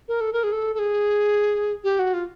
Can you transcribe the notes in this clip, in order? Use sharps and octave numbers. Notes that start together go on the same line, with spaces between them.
A#4
A4
A#4
G#4
A4
A4
G#4
G4
F#4
F4